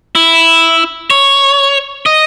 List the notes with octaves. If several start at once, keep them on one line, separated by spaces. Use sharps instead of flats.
E4
C#5
D#5